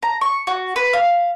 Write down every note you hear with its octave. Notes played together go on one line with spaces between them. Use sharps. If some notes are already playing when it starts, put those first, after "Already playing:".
A#5
C#6
F#4
B4
F5